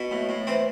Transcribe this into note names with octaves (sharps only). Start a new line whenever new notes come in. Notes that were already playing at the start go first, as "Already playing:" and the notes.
Already playing: B2
A2
A2
E3 C4